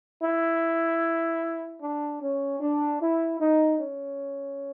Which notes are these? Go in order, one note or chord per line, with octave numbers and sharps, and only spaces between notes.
E4
D4
C#4
D4
E4
D#4
C#4